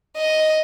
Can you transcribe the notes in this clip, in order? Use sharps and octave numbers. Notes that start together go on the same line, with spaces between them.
D#5